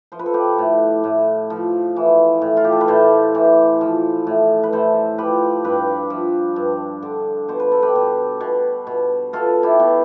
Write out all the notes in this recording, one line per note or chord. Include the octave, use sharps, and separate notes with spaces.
F3 C5
B4
A4
G4 B4
A2
A2
F3
E3
A2
F4
G4
A4
B4
A2 A4 C5
E3
F3
A2
B4
A2 A4 C5
F3 G4 B4
G2 G4 B4
F3
G2
D3
B2 C5
B4
A4
G4 B4
B2
B2
B2
B2 F4 A4
E4 G4
B2